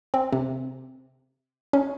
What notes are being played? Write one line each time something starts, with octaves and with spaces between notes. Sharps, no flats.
C4
C3
C#4